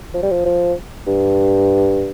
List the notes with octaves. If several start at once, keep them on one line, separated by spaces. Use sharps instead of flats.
F3
G3
F3
F3
G2